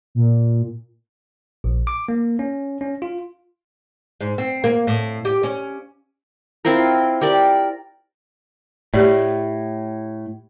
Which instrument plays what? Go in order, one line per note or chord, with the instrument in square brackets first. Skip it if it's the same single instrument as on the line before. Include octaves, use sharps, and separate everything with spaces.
[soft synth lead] A#2
[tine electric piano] A#1
D6
A#3
C#4
C#4
F4
[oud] G#2
C4
A#3
A2
G4
C#4
[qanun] C4 E4 F4 A#4
G4 A#4 D5
[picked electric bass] A2 [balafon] A3 G4 D5